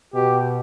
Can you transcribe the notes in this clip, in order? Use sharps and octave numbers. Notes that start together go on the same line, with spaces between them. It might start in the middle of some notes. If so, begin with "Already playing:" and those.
B2 G4